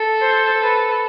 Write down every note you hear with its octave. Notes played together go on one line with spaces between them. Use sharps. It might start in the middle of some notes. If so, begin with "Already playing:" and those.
Already playing: A4
C5
B4